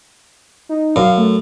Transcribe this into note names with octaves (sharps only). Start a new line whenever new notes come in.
D#4
F#2 F5
A3